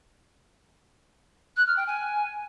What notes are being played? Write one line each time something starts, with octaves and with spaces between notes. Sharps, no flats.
F#6
F6
G5
G#5